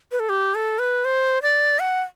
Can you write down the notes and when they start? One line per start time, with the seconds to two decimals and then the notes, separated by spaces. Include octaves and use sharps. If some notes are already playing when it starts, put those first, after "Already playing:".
0.12 B4
0.20 A4
0.29 G4
0.55 A4
0.79 B4
1.05 C5
1.43 D5
1.79 F#5